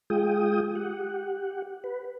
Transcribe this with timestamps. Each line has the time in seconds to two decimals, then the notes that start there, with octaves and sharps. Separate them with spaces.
0.10 G#3 F4 G#4 G5 D#6
0.75 G4 F#5
1.84 B4